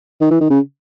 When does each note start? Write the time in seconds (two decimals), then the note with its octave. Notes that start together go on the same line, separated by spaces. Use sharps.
0.21 D#3
0.31 E3
0.41 D#3
0.50 C#3